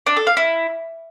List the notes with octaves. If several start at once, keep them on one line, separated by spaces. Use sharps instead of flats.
D4
A4
F5
E4